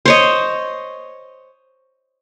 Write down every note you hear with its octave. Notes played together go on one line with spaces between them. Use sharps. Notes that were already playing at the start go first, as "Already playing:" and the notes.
C5 C#5 D#5